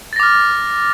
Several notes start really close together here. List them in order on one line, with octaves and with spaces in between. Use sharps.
A6 A#6 D6 F6